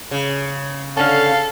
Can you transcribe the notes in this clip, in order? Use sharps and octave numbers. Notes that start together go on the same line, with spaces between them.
C#3
D3 C#4 A4 F5